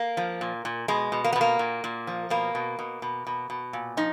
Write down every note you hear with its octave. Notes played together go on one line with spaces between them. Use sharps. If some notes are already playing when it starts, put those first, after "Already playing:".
Already playing: A#3
F3
A#2
A#2
B2 G#3
B2
A#3
B3
B2
A#3
A#2
A#2
F3
B2 A#3
B2
B2
B2
B2
B2
A#2
F3 D#4